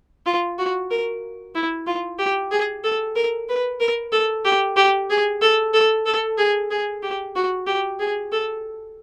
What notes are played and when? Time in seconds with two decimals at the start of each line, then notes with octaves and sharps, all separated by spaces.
0.26 F4
0.58 F#4
0.91 A#4
1.55 E4
1.87 F4
2.19 G4
2.51 G#4
2.84 A4
3.16 A#4
3.49 B4
3.80 A#4
4.12 A4
4.45 G4
4.77 G4
5.10 G#4
5.42 A4
5.74 A4
6.06 A4
6.38 G#4
6.71 G#4
7.03 G4
7.36 F#4
7.67 G4
7.99 G#4
8.32 A4